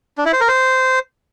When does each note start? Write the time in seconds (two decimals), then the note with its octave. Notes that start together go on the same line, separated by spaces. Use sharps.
0.18 D4
0.25 E4
0.33 C5
0.41 A#4
0.48 C5